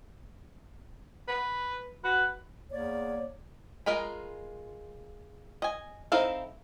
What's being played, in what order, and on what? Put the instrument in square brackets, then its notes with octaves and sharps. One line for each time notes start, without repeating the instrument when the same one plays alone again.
[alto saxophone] B4
[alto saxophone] F#4 [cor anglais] B4
[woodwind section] E2 A#3 D5 [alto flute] C#5
[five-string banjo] G#3 F4 A#4 D#5 B5
D#5 G#5
C4 D#4 E4 A4 F5